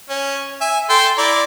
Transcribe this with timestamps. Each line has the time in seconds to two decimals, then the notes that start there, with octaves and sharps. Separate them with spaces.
0.09 C#4
0.61 E5 G#5
0.89 A4 G5 C6
1.18 E4 D5 A#5